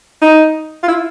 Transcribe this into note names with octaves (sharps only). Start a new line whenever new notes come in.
D#4
F4
E4